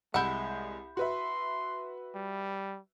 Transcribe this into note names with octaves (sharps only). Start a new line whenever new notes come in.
C2 G#3 E4 F#5 G6
F#4 B4 E5 C6
G3